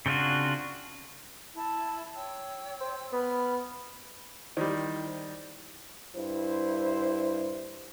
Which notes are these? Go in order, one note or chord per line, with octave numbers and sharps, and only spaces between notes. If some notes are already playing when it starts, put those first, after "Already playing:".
C#3 C4 D4 F4 F#4
E4 A5
C#5 G5 E6
C5
B3 B5 F6
D#3 G3 E4 C5 D5
G2 E4 C5